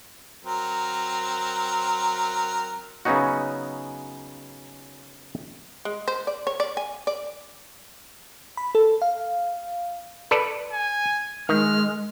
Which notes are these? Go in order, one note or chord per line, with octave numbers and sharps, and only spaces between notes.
F#3 C4 A#4
C#3 F#3 B3 C#4 D#4 F#4
G#3
C5
D5
C#5
D5
G#5
D5
B5
A4
F5
A4 B4 D5
G#5
D#3 G#3 F6